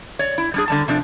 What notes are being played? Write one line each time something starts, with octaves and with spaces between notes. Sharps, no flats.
C#5 D5
E4
G3 D4 G#4
D3 G3 A5
C3 F3 D4